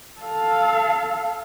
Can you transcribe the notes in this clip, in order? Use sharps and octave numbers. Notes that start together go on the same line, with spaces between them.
A4 F5